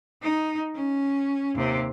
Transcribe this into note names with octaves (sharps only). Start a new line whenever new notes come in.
D#4
C#4
D#2 C3